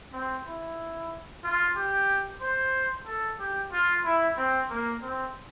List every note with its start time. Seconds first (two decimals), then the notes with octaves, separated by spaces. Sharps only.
0.13 C4
0.46 E4
1.44 F4
1.76 G4
2.41 C5
3.06 A4
3.39 G4
3.72 F4
4.04 E4
4.37 C4
4.70 A#3
5.02 C4